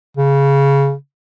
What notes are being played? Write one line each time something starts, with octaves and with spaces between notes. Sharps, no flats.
C#3